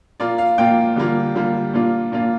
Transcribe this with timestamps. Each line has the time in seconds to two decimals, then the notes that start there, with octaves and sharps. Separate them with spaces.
0.20 A#2 A#3 F4 D5
0.38 F5
0.58 A#2 A#3 F4 G5
0.96 D3 G3 A#3 F4
1.35 D3 G3 A#3 F4
1.73 A#2 A#3 D4 F4
2.12 A#2 A#3 D4 F4